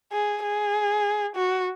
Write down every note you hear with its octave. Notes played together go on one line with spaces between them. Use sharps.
G#4
G#4
F#4